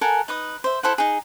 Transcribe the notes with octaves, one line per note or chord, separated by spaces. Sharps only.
A4 A#4 F#5 G#5
D#4 B4 D#6
C5 E5
E4 A4 C5 F#5
D#4 G#4